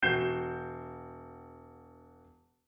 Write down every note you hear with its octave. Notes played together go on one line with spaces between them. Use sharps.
E1 F#4 G6 C7 E7